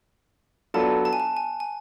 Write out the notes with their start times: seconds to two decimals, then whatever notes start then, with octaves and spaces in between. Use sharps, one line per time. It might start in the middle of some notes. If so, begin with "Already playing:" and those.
0.74 F#3 B3 D4 F4 A4 A5
1.05 A5
1.13 G#5
1.20 A5
1.36 G#5
1.60 G#5